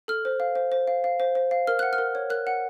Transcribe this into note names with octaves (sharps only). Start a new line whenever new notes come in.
A4 F6
C5
F5
C5
C5
F5
F5
C5
C5
F5
A#4 F6
F#5 F#6
F6
A#4
C#5
A#4 F#6
F#5